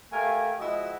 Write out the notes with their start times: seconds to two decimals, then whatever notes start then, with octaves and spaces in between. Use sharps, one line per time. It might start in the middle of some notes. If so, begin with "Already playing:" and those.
0.13 A3 G4 A#4 F5 G#5
0.60 F3 G#3 E4 F#4 D#5